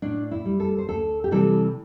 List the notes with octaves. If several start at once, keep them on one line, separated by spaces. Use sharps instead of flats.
A2 D4
E4
G3
A4
C5
D2 A4
G4
C3 E3 G3 A4